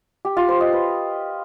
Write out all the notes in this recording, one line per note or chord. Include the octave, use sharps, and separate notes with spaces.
G4
F4
C5
D#5
B4